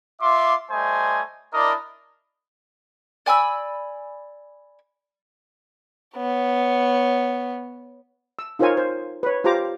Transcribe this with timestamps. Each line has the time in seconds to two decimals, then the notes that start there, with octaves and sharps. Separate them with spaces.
0.22 F4 E5 C6 D6
0.71 G3 A3 C5 D#5 G#5
1.54 D4 E4 A#4 D5 D#5
3.26 D5 G#5 B5 E6
6.17 B3 C#5
8.39 E6
8.59 D#4 F4 A#4 C5 C#5 G#5
8.77 C5
9.23 B4 C#5
9.44 F4 G4 C5 A#5 D6